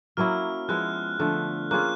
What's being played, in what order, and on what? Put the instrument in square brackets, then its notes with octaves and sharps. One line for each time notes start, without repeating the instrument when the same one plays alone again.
[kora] F#3 A#3 C#4 E4 [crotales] F6
[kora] F3 G#3 B3 E4 [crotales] F#6
[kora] D3 F3 A3
[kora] A#3 C#4 F4 G#4 [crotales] F#6